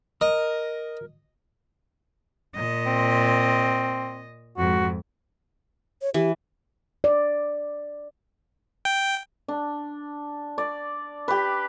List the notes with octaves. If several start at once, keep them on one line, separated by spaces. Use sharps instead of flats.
A#4 D#5
A#2 D#5
C4
F2 G#2 F#4
C#5
E3 G4
D5
G5
D4
D5
G4 B4